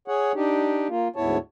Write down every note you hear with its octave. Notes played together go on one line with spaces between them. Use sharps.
G#4 C#5 F#5
D4 D#4 G4
A#3 F4
D2 G#2 B3 E4 C#5 A5